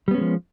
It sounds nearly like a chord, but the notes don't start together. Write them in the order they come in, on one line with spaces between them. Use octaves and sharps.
G3 B3 C#4 G#3 F3